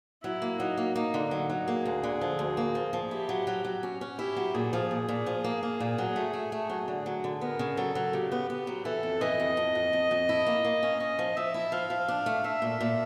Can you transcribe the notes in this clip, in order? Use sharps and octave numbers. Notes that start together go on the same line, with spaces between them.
F#3 E4
A#3
F#3 D#4
A#3
A#3 D#4
D3
F#3 D#4
F#3
A#3 G#4
D2
D3
F3
D2
A#3
F3
F3
E4 G4
F#3
F#3
F#3
C#4
C#4
E4 G4
F#3
A#2 G#4
F3
A#2
A#2
F3
A#3
A#3
A#2
F#3
A3
A3
A3
F#3
D3
F#3
D3
B3 A#4
C#3
F#3 A4
F#3
C#3 G4
B3
B3
F#3
E3 A4
F2
E3 D#5
F2
F2
F2
F2
F2
E4
A#3
A#3
C#4
C#4 D#5
F3
F3 E5
E4
F3 F5
F3
D4
A3
A3 E5
A#2
A#2